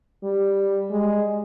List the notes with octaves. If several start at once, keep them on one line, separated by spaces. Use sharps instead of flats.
G3
G#3